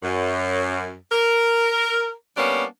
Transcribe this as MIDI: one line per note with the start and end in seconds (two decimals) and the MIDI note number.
0.03 0.93 42
1.11 2.12 70
2.37 2.64 55
2.37 2.64 58
2.37 2.64 59
2.37 2.64 61
2.37 2.64 62